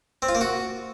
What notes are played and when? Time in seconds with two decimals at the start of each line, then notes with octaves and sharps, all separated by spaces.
0.22 C4
0.29 F4
0.35 A#3
0.41 F#4